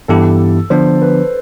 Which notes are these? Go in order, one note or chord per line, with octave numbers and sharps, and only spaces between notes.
G2 E3 B3 E4 G4 A4
D3 F3 B3 D4 C5
B4